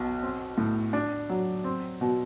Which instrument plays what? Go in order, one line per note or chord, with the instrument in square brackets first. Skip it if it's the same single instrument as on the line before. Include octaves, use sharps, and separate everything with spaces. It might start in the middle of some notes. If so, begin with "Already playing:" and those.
Already playing: [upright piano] B1 B2
C4
A2
D4
F#3
C4
B2